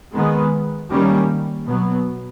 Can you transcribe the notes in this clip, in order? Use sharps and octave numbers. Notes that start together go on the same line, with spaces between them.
D#3 G#3 B3
D#3 G3 A#3 C#4
B2 F#3 B3